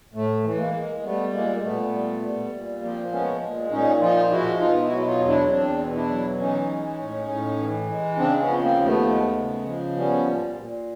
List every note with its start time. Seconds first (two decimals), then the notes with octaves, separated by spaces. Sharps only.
0.14 A2 A3
0.44 E3
0.54 A3
0.58 G#3 A#3
0.74 G#3
1.03 G3 A3 B3
1.33 A#2 G#3 A#3
1.63 A#2 A3 B3
1.92 G3
2.22 G3
2.53 A#2
2.81 F3 A#3 C4
3.12 G#3 B3 C#4
3.42 A#2
3.71 A#2 C#4 D#4
4.01 F3 D#4 F4
4.31 G#3 E4 F#4
4.60 B2 D#4 F4
4.82 E4 F#4
4.90 F#3
4.98 E4
5.05 D#4 F4
5.20 E2
5.28 D4 E4
5.49 E2 C4 D4
5.80 B2
5.94 D4 E4
6.09 F#3
6.39 E3 C#4 D#4
6.69 G#3
6.98 A2
7.28 A2
7.59 E3
7.89 G#3
8.17 C#3 C4 D4
8.40 B3 C#4
8.48 F3
8.62 A#3 C4
8.77 D#2
8.85 A3 B3
9.08 G#3
9.37 C#3
9.66 F3
9.96 G3 B3 C#4
10.27 A#2
10.56 A#2